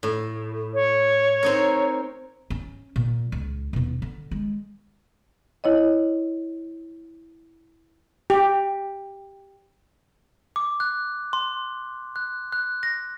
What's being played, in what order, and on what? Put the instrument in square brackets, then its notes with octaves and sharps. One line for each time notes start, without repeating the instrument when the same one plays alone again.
[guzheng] A2
[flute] C#5
[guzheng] C4 D#4 A#4
[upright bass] C#4
A#2
C#2
D#1 B2
D3
G#3
[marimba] E4 C#5 D#5
[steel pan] G4
[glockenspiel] D6
F#6
C6
F#6
F#6
A#6